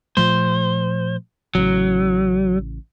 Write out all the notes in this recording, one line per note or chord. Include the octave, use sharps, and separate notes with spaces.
A#2 F3 A3 C5
A1 A2 C#3 F#3